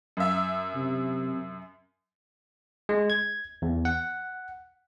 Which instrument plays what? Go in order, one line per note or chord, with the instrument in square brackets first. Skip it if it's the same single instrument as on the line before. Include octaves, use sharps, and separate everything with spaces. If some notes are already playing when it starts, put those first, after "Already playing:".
[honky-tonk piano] F#2 E5
[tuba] C3
[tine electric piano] G#3
G#6
E2
F#5